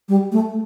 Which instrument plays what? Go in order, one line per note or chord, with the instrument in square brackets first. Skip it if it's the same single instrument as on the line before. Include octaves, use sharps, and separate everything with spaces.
[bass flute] G3
A3